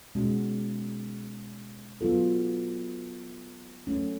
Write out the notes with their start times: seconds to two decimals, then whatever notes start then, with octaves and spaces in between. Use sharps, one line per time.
0.15 B2 G#3 C#4 F#4
2.01 F#3 B3 F4 A4
3.87 F#3 A3 C#4